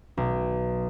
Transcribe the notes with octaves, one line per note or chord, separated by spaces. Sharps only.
B1